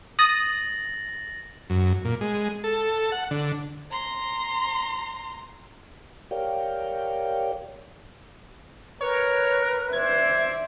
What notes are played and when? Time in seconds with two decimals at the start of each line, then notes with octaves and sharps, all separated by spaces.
0.19 D#6 A6 A#6 F#7
1.70 F#2
2.05 A#2
2.21 G#3
2.64 A4
3.12 F#5
3.31 D3
3.91 A#5 C6
6.31 G4 A#4 C#5 D5 F5 G5
9.01 A#4 B4 C#5
9.93 C5 D5 E5 G#6